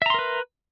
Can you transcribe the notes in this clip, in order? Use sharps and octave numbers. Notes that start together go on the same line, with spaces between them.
A#4 B4 E5 A#5 C6